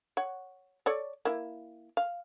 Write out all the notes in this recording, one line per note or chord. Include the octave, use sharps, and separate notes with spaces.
C#5 F#5
A4 C#5 D5
A#3 E4
F5